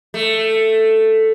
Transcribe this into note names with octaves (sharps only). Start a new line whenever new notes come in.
A3